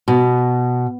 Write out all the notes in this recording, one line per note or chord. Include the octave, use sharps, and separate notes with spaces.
B2